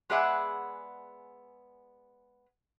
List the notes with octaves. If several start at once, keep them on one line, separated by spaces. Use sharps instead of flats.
G#3 B3 G#4 D5 E5 F#5